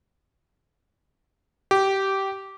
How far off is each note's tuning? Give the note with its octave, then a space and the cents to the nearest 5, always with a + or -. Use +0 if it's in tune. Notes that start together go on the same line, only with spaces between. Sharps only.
G4 -15